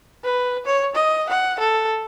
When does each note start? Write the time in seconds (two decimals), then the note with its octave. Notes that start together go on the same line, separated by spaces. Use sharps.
0.24 B4
0.65 C#5
0.95 D#5
1.29 F#5
1.59 A4